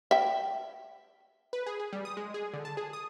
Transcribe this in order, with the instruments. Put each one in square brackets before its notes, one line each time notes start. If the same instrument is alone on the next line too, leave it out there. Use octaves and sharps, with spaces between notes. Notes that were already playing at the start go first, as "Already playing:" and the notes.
[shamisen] E5 G5
[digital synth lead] B4
G#4
G#4
G3
D#6
G#3
G#4
D3
A5
G#4
D#6